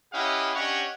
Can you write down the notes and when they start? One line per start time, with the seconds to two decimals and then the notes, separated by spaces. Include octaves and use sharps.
0.13 C#4 E4 G4 D#5 F5 F#5
0.55 C#4 D4 G4 C#5 D#5 F#5